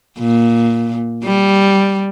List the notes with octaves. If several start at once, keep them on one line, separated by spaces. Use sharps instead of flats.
A#2
G3